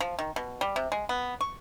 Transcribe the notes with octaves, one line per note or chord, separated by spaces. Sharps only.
F3
D#3
B2
G3
C3
G#3
B3
C#6